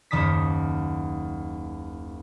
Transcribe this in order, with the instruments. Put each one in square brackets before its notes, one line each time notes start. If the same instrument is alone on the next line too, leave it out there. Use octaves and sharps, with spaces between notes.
[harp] F#1 D#2 D#3 A5 D#6 B6